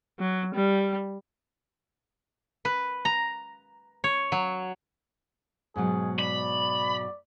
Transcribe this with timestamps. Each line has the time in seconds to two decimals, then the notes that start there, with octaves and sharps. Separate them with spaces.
0.19 F#3
0.55 G3
2.65 B4
3.05 A#5
4.04 C#5
4.32 F#3
5.76 G#2 B2 F#3 G#4
6.19 D5 B5